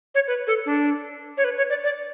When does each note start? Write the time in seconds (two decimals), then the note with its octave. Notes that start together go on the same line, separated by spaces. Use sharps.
0.15 C#5
0.28 B4
0.47 A4
0.66 D4
1.37 C#5
1.44 B4
1.57 C#5
1.70 D5
1.84 D5